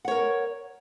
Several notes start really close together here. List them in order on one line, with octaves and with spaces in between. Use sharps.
F#5 C#5 A#4